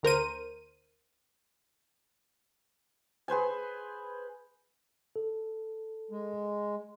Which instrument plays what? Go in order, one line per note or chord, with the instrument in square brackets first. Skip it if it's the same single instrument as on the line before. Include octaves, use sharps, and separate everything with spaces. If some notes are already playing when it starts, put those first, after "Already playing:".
[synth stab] D2 A#4 C5 D#7
[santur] G#4 B4 C5 G#5
[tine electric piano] A4
[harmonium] G#3